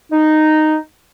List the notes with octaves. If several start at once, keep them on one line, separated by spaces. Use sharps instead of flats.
D#4